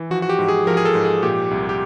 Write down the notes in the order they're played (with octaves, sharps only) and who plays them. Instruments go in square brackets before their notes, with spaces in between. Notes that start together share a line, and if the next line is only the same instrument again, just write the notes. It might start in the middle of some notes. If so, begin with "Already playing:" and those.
Already playing: [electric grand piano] E3
F3 F#4
F#4
G4
G#2
G#4
F3 A#4
G#4
A4
G#2
G#4
A#2 G4
C2
G4